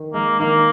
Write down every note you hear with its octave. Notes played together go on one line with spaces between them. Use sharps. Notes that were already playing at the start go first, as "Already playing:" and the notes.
Already playing: D#3
G#3 A#3
D#3 A#3